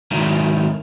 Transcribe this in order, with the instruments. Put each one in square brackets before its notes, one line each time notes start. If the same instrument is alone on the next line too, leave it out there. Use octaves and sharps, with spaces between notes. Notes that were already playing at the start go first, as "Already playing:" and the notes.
[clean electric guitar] G#2 D#3 F#3 E4 A#4